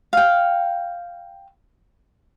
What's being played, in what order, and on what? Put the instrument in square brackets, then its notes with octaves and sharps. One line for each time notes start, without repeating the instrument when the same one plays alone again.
[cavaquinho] F5 G5